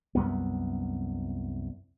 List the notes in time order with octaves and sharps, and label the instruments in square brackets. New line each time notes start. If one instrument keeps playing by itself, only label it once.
[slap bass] C2 F#2 B3